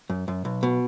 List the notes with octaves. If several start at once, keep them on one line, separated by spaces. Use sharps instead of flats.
F#2
F#2
B1
B2